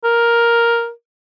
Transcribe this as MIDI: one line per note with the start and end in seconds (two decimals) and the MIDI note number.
0.04 0.91 70